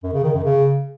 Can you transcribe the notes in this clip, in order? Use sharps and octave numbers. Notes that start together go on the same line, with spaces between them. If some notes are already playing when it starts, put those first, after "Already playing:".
F#2
C#3
D#3
F#2
C#3